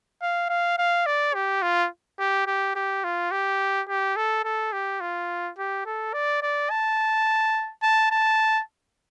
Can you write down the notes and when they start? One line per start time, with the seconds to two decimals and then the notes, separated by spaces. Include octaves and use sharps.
0.22 F5
0.49 F5
0.78 F5
1.06 D5
1.34 G4
1.62 F4
2.19 G4
2.47 G4
2.75 G4
3.04 F4
3.31 G4
3.89 G4
4.16 A4
4.45 A4
4.73 G4
5.01 F4
5.58 G4
5.86 A4
6.13 D5
6.42 D5
6.70 A5
7.83 A5
8.11 A5